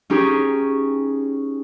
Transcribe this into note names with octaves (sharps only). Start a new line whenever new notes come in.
C#4 D#4 G4 G#4